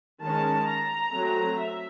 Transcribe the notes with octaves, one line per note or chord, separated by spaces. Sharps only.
D#3 G#3 C#4 A5
A#5
F#3 A3 C4
E5